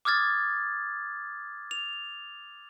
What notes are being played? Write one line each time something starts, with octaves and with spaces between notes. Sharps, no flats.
D6 D#6 F6 G#6 A6
F7